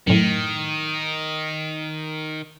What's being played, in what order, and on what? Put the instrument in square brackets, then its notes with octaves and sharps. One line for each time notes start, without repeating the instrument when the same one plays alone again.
[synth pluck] F#2 A2 [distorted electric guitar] D#3